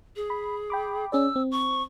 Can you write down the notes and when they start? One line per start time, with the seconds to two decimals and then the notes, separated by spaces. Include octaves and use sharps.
0.16 G#4
0.30 B5
0.70 G5 B5 D6
1.12 C#4 G#4 D5 E6
1.36 C4
1.51 C#6